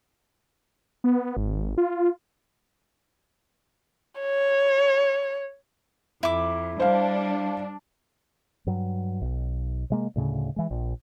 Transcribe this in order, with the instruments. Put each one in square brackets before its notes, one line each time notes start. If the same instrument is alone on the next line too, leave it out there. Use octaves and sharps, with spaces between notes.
[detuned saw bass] B3
G#1
F4
[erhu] C#5
[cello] F2 [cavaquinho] E4 D6
[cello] G3 [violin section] D4 [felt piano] C5 F5
[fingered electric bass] G2 F#3
B1
C3 G#3 A#3
D2 A2 C#3
E3 G#3
A#1